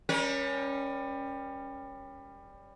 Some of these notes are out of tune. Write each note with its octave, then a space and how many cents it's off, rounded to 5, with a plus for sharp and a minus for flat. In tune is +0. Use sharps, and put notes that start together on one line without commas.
G3 +20 C#4 +0 A#4 +40